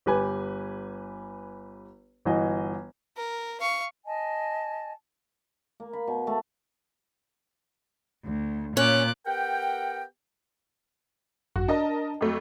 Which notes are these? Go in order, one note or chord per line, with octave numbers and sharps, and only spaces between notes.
G1 G4 B4 G#5
G1 E3 F#4 D#5
A#4
F5 C#6
D#5 G#5 A5
A#3
B5
B2
A3
D2
A#2 C#4 D6 F#6
B3 G4 A#4 F#5 G5
G#1 F#2 F#4
D4 A#4 D#5 A5
F2 F#3 A3